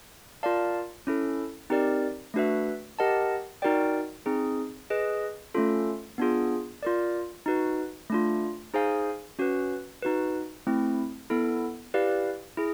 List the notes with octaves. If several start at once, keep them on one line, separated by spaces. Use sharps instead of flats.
F4 A#4 D5 F5 A5
C#4 E4 A4
C4 D#4 G4 A#4 D5
A3 D4 F#4 B4 E5
G4 A#4 D#5 F#5 A5
D#4 F#4 A#4 D5 G5
C4 D#4 G#4
G#4 B4 D#5
A3 C#4 F4 A4
B3 D4 F4 G#4
F4 A#4 D5
D#4 F#4 B4
A3 D4 F4
D#4 G#4 C5 F5 G#5
C#4 F#4 B4
D#4 F#4 B4
A3 C4 E4
B3 E4 A4
E4 G4 B4 D5 F5
E4 G#4